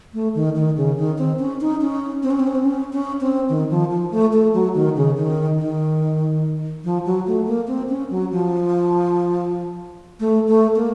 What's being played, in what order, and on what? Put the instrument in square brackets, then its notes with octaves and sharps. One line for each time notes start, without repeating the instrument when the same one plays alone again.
[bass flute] A3
D#3
D#3
C#3
D#3
C4
C#4
D#4
C#4
C4
C#4
C4
C#4
C4
C#4
C#4
C4
D#3
F3
F3
A3
A3
F#3
D#3
C#3
D#3
D#3
F3
F#3
A3
A#3
C4
C#4
F#3
F3
A3
A3
A#3